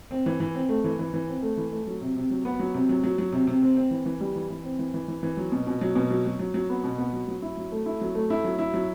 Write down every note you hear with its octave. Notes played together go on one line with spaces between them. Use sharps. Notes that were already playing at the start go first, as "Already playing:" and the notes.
C4
E3
E3
C4
A3
E3
E3
E3
C4
A3
E3
A3
F#3
C3
C3
F#3
B3
F#3
C3
F#3
F#3
F#3
C3
C3
C4
C4
E3
E3
G3
E3
E3
C4
E3
E3
E3
E3
F#3
B2
B2
F#3
B2
F#3
F#3
F#3
F#3
B3
B2
B3
F#3
F#3
E4
F#3
A3
E4
F#3
A3
E4
F#3
E4
F#3